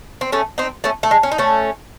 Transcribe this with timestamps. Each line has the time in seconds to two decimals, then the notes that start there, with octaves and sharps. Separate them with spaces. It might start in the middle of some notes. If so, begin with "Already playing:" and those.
0.21 C4
0.32 A3 C#4
0.58 C4 D#4
0.84 A3 C#4
1.03 A3
1.11 G#3
1.23 C#4
1.31 D#4
1.38 A3 C#4